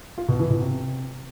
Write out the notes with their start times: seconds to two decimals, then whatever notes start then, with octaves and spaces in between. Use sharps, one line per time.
0.18 F4
0.28 B2
0.39 E3
0.50 B2
0.61 C3